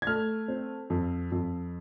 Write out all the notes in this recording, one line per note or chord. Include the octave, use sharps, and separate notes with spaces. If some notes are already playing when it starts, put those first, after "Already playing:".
G#6
A3 F6
C4
F2
F2